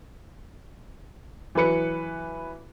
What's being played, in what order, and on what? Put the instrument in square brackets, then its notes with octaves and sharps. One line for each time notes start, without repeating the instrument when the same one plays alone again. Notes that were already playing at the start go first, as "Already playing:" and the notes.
[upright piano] E3 F#3 B4 C#7